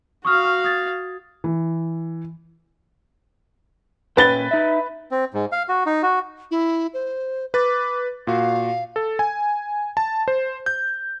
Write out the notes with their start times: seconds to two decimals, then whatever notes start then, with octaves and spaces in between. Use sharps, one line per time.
0.25 F#4 F5 C#6 D#6 F6
0.64 D#6 G#6 A6
1.44 E3
4.17 A#2 C#4 B4 G5 A6 G7
4.51 D#4 E5
5.11 C4
5.34 G#2
5.52 F5
5.69 F#4
5.86 D#4
6.03 F#4
6.51 E4
6.94 C5
7.54 B4 D6 A6
8.27 A#2 F#4 F5
8.96 A4
9.19 G#5
9.97 A5
10.28 C5
10.66 G6